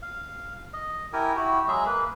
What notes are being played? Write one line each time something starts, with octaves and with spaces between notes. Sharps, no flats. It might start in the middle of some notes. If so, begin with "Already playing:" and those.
F5
D#5
E4 G4 A#4 G#5
E4 F#4 G4
F#3 G#3 G#4 E5
A#3 B4